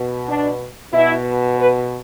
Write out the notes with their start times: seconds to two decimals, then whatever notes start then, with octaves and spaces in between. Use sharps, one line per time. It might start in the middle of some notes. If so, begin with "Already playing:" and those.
Already playing: B2
0.29 D4
0.94 B2 E4
1.59 B4